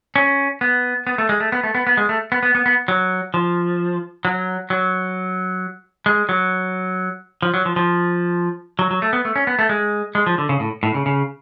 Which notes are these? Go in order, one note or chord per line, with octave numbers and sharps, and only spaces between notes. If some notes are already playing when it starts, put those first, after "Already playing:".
C#4
B3
B3
A3
G#3
A3
B3
A3
B3
B3
G#3
A3
B3
B3
B3
B3
F#3
F3
F#3
F#3
G#3
F#3
F3
F#3
F3
F3
F#3
F#3
A3
B3
A3
C#4
B3
A3
G#3
G#3
F3
D3
C#3
A2
A2
C#3
C#3